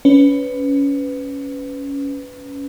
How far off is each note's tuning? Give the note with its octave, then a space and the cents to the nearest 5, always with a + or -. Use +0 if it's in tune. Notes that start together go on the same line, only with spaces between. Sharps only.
C#4 +15 B4 +15